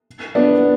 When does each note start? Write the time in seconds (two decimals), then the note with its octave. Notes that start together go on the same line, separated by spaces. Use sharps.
0.35 B3 D4